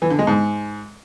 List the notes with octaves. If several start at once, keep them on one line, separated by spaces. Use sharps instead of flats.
E3
D3
G#3
G#2